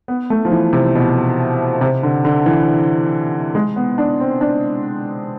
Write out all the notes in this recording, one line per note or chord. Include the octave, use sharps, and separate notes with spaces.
B3
A3
F3
E3
C3
B2
C3
D3
D3
E3
G#3
B3
D4
C4
D4